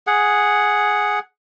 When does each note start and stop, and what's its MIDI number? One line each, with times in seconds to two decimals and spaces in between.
0.07 1.19 68
0.07 1.19 78